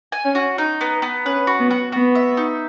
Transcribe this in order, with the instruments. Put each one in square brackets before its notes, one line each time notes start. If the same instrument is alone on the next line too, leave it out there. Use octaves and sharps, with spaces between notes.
[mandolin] G#5
[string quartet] C#4
[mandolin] F#4
D#4
B3
B3
[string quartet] C#4 [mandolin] B4
[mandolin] F#4
[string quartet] B3
[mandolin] F#4
[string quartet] B3 [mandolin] F#4
[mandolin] E5
D#4